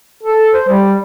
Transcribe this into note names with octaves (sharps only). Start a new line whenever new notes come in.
A4
C5
G3